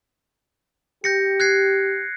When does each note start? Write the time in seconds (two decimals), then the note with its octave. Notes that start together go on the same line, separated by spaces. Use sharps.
1.04 G4 G6 A#6 C#7
1.40 F#6 G#6 C7